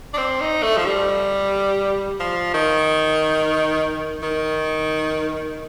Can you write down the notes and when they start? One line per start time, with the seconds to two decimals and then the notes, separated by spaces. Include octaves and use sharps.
0.14 D4
0.18 C4
0.41 D#4
0.63 A3
0.77 F3
0.86 G3
2.20 F3
2.54 D#3
4.23 D#3